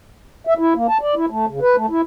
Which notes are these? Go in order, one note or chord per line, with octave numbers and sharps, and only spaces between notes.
E5
E4
A#3
A5
D5
E4
A3
C#3
B4
A3
E4